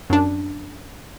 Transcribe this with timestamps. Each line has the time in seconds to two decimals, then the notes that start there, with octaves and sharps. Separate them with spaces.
0.10 F#2 D4